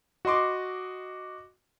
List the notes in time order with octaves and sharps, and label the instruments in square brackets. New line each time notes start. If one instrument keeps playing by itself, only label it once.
[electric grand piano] F#4 D#5 C6 D6